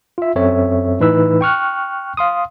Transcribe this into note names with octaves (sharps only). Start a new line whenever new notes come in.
F4 E5
F#2 C4 A4 C#5 E5
A2 E3 D#4 B4 B5 E6
G5 C#6 F6 F#6
F5 C6 D#6